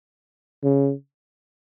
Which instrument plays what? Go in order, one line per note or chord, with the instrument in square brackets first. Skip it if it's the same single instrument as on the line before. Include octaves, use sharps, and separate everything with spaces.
[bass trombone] C#3